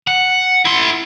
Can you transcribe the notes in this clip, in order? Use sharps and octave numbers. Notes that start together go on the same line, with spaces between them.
F#5
E4 C6